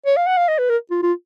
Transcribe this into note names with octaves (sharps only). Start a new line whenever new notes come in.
C#5
F5
F#5
F5
D#5
B4
A#4
F4
F4